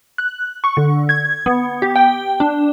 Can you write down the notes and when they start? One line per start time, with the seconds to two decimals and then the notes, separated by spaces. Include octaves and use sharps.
0.18 F#6
0.64 C#6
0.77 D3
1.09 G#6
1.46 B3
1.82 G4
1.96 G5
2.40 D4